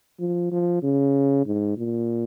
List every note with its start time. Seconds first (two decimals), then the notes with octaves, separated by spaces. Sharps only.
0.19 F3
0.52 F3
0.83 C#3
1.46 G#2
1.77 A#2